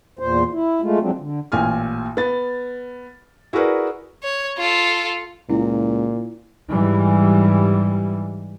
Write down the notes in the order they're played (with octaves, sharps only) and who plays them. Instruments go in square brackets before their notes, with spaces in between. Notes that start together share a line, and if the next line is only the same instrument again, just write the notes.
[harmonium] E2 A#2 C5
E4
G#3 A3 F4
F3 F#3 G#3 C4 D4
D3
[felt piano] A1 A#2 G#5 F6
B3 A6
E4 F#4 G#4 A#4 B4 D5
[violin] C#5
F4 A4
[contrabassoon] C#2 [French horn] A#2 [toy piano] E4
[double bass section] G#2 E3 G3